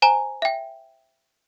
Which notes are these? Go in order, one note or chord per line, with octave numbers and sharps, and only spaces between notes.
C5 G#5 A#5
E5 G5